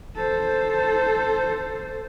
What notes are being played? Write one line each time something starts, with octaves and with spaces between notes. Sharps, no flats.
A4 C5